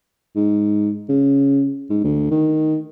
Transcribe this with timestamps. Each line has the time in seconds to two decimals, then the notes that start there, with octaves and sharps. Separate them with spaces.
0.36 G#2
1.09 C#3
1.90 G#2
2.04 D2
2.31 D#3